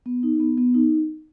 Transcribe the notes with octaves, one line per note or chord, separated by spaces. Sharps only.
B3
D#4
B3
B3
D#4